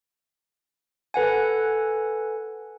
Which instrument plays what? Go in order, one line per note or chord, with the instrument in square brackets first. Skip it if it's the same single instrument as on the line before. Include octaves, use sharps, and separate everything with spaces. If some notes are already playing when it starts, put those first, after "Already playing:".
[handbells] A4 B4 F#5 G#5